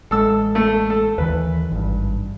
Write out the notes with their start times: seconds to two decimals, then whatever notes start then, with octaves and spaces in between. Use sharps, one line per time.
0.11 A1 G#3 A4 E6
0.55 A3
0.90 A4
1.18 D#2 D#3 E3 B4
1.71 G#1 G2